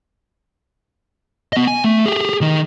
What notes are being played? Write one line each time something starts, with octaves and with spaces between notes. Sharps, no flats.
B3 D#5
G#5
A3
G4 G#4
D#3 D#4